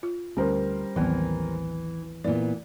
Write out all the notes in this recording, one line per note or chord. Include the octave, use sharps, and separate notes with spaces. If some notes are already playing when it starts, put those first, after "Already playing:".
F4
D2 G3 C#4 A#4 C5
A1 D#2 E3 F#3 B3 C4
A#2 E3 B3 D5